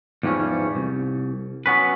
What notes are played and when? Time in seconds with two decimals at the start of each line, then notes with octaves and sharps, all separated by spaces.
0.23 E2 G#2 F3 G3 C#4
0.75 C2
1.66 F#3 B3 C#4 B4